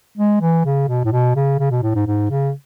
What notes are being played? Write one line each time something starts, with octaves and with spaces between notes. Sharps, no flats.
G#3
E3
C#3
B2
A2
B2
C#3
C#3
B2
A2
G#2
G#2
C#3